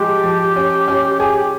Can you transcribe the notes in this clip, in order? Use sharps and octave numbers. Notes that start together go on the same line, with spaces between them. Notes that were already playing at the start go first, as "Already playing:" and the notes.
Already playing: F3 G#3 G4
F3
C#4
C#4
G4 G#4
G4